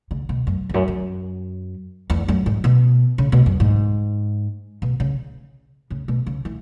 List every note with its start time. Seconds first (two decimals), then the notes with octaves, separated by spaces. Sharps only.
0.11 C#3
0.29 B2
0.47 F#2
0.69 E2
0.74 F#2
0.88 F#2
2.10 E2
2.28 F#2
2.46 G#2
2.64 B2
3.18 C#3
3.32 B2
3.46 F#2
3.60 G#2
4.82 B2
5.00 C#3
5.90 C#3
6.08 B2
6.26 C#3
6.45 E3